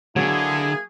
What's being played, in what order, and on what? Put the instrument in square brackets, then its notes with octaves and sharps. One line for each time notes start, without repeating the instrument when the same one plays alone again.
[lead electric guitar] D3 [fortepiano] F#3 [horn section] A#3 E4 G#4 [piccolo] G#6